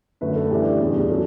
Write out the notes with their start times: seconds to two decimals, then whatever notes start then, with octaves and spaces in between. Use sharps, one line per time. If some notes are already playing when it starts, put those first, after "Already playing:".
0.21 F#2 D3 A3 B4
0.36 A4
0.50 A2 E3 G3 D4 G4
0.80 E2 C#3 G3 D4
1.09 F#3 C#4 A4